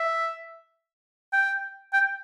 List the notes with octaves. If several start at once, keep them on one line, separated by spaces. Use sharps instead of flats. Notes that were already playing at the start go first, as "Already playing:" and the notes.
Already playing: E5
G5
G5